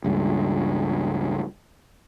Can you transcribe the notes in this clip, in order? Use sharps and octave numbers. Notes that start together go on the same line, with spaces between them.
C#2 G2